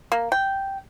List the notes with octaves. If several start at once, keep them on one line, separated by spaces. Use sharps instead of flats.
A#3
G5